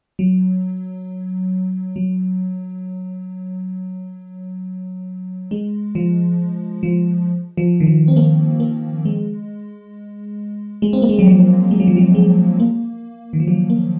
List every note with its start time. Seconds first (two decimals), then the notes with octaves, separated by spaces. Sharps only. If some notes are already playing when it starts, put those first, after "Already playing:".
0.19 F#3
1.96 F#3
5.51 G#3
5.95 F3
6.83 F3
7.57 F3
7.80 D#3
7.87 F3
8.08 C4
8.16 A#3
8.60 A#3
9.05 G#3
10.82 G#3
10.93 C4
11.02 A#3
11.09 G#3
11.19 F#3
11.26 F3
11.71 G#3
11.80 F#3
11.87 F3
11.97 F#3
12.15 G#3
12.60 A#3
13.33 D#3
13.40 F3
13.48 F#3
13.70 A#3